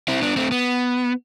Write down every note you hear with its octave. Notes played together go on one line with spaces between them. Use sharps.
C4 E4
B3 D4
A3 C4
B3